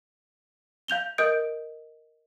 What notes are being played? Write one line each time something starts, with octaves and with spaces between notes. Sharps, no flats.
F5 G6 F7 G7
A#4 D#5 D#6 G6 D7